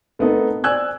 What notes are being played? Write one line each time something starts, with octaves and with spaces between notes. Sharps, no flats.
A3 B3 C4 D#4 A4 A#4
C5 D5 G#5 E6 F#6 G#6